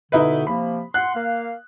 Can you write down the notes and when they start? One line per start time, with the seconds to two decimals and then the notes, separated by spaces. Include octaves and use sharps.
0.12 B2 D3 D#4 E4 B4
0.47 C3 F3 A#3 B5
0.94 F#5 C6 F#6
1.14 A#3 F5